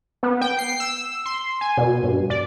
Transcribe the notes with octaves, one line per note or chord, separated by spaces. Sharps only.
B3
G5
C7
E6
C6
G#5
B2
G2
D5